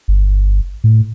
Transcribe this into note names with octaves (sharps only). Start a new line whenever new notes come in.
G1
A2